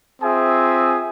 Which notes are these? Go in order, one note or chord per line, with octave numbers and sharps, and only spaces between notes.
C4 F4 G#4 E5 G#5 D#6